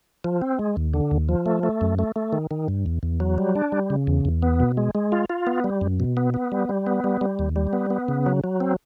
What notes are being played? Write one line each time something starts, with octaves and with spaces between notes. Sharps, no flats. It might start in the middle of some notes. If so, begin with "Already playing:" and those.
F3
C4
G#3
D#2
D3
D#2
F3
A3
A3
F#2
A3
A3
D#3
D#3
G2
E2
E2
F#3
G3
D4
G3
C#3
E2
E2
B3
B2
G#3
G#3
F4
F4
B3
G3
F#2
B2
B3
B3
G3
G3
B3
G3
G3
D#2
G3
B3
B3
C#3
F#3
F#3
C4